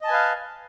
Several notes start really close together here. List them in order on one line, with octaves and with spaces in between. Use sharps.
D#5 A5 G#5 B4 F5